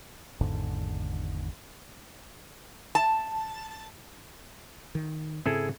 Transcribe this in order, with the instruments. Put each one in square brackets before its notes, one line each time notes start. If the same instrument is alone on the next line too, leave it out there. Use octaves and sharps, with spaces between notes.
[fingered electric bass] G#1 E2 G#2 D3
[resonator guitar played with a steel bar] A5
[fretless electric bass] D#3
[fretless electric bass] G#2 C#3 C4 [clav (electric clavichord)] E4 G#4 A4